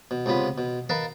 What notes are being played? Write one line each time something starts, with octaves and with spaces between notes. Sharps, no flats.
B2
C#2 C3 B3 F4 B5
B2
A#4 B4 D#5 F5 A5 A#5